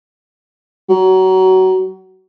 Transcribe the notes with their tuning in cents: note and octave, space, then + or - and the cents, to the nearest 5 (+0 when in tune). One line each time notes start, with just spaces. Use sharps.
F#3 +25